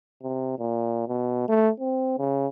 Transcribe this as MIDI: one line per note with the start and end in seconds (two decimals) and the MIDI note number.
0.22 0.54 48
0.59 1.03 46
1.08 1.47 47
1.48 1.70 57
1.80 2.17 60
2.18 2.47 49